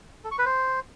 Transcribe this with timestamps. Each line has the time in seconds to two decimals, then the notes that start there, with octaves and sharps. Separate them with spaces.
0.24 A4
0.31 C#6
0.39 B4
0.46 C5